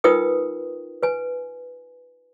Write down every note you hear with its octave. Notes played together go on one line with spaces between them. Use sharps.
D#4 F4 A#4 B4 G5 D#6
B4 G#5